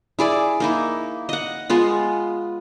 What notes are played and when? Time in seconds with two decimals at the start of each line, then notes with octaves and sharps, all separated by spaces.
0.19 E4 G#4 D5
0.60 A#3 D#4 E4
1.29 D#5 F#5
1.70 G#3 B3 F4